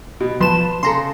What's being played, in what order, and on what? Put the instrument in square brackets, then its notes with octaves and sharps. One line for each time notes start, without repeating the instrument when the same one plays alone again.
[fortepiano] B2
[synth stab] F3 E7 [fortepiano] B4 A5 C6
[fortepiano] C#3 [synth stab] A4 A#5 C6